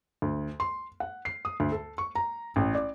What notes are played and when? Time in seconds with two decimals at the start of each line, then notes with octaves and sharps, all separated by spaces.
0.22 D2
0.60 C6
1.00 F#5
1.25 C7
1.45 D#6
1.60 D2
1.72 A4
1.98 C#6
2.15 A#5
2.56 A1
2.75 D5